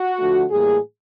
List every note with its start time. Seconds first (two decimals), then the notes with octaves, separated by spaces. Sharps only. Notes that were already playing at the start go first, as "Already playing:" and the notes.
Already playing: F#4
0.19 D3 F3 A3
0.50 A2 E3 G3 A#3 G#4